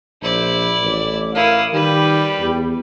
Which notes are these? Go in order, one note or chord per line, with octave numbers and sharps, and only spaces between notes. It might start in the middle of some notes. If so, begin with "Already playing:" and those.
A#1 E4 C5 D5
A1 D6
E4 A#4 F5 D#6
D#3 G3 G4 B4
E2